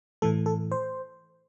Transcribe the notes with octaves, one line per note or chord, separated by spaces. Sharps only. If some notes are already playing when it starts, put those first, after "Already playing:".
A2 E3 A3 A4
A4
C5